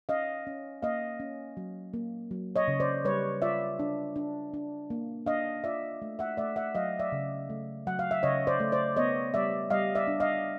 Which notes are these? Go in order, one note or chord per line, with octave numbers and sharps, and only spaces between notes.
C#4 D#5 F5
C#4
A#3 D#5 F5
C#4
F#3
A#3
F#3
C#5 D#5
C#3
C5 D5
G3 B4 C#5
F4 D5 E5
D4
D4
D4
A#3
D4 D#5 F5
F4 D5 E5
A3
E5 F#5
A3 D5 E5
E5 F#5
F#3 D#5 F5
D5 E5
C#3
A3
F#3 F#5
F5
E5
C#3 C#5 D#5
C5 D5
A3
C5 D5
B3 C#5 D#5
G3 D5 E5
G3 D#5 F5
D5 E5
D4
D#5 F5